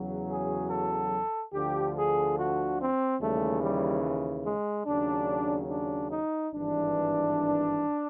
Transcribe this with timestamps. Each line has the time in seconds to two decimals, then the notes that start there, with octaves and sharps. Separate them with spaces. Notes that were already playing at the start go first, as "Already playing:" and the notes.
Already playing: E2 C#3 F#3
0.29 G#4
0.70 A4
1.53 D2 D3 F3 G4
1.96 G#4
2.37 F#4
2.79 C4
3.20 D#2 C#3 E3 G3 A3
3.61 G3
4.45 G#3
4.86 D#2 C#3 F#3 D4
5.69 D4
6.10 D#4
6.52 G#1 G2 E3 D4